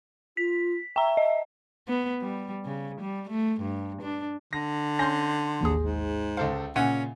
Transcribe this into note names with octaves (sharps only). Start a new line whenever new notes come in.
F4 B6
E5 G5 A#5
D#5
B3
G3
C#3
G3
A3
G2
D4
D3 A#6
C#4 C6 G6 A#6
A1 D#2 G#4
G#2
C#2 A4 C5 F5
A#2 C#3 C#4 E5 F#5 G#5